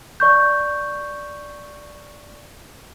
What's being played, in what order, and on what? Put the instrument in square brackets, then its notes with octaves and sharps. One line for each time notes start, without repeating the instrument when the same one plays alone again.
[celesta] D5 C#6 G6